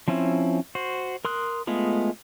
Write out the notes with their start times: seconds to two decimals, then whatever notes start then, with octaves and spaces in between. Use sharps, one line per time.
0.08 F3 C4 C#4 E4
0.75 F#4 C5
1.25 A#4 C6 D#6 F#6
1.67 G#3 A3 B3 F4 G#4